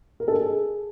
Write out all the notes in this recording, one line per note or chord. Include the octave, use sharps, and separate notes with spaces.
A#4
A4
G#4